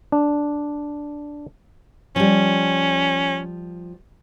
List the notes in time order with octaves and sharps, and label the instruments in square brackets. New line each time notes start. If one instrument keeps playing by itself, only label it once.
[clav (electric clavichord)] D4
[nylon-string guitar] F3 G3 [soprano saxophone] C#4